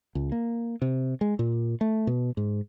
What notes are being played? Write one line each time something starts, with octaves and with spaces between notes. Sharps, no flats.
C#2
A#3
C3
G#3
A#2
A3
B2
G#2